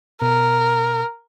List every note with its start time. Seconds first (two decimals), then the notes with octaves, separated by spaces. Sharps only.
0.22 B2 A#4